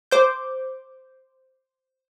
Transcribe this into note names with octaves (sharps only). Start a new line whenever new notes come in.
C5 D6 G6